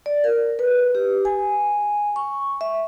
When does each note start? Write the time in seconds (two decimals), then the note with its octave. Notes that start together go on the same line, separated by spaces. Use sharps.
0.06 D5
0.24 A#4
0.59 B4
0.95 G4
1.25 G#5
2.16 C#6
2.61 E5